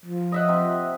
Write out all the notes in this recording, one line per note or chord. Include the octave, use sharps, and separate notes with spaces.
F3
D#5 E5 F#5
C3